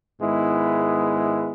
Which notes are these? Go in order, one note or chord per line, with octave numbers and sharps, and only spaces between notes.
G#2 D#3 G#3 B3 E4